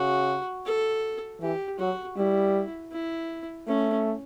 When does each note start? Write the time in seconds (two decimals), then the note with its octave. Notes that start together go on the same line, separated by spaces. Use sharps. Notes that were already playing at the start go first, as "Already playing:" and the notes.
Already playing: C#3 F#4
0.66 A4
1.41 E3 G4
1.79 F#3 F#4
2.17 G3 E4
2.92 E4
3.67 A3 C#4